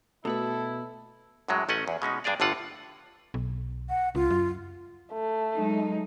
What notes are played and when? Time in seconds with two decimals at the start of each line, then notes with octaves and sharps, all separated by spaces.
0.25 B2 A3 E4 F#4 A4 B4
1.48 F#2 A2 F#3 G#3
1.69 A1 A3 C#4 D#5 F#5
1.88 E2
2.02 B2 G#3 C#4 D#4
2.24 G2 D4 G#4 D5 F5
2.40 G1 A2 D3 F4 F#5
3.34 B1
3.89 F#5
4.15 C#2 F4
4.30 F#2
5.13 A3
5.56 F#3 G#3 D#4